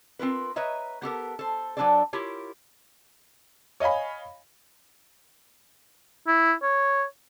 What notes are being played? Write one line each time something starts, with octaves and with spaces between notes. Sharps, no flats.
C4 F4 A#4 B4
B4 C#5 D#5 E5 A#5
B3 G4 A4 A#4
A4 C5
F#3 A#3 D4 A4 C5 D5
E4 F4 G4 A#4 C#5
C#5 D#5 F5 G#5 B5
E4
C#5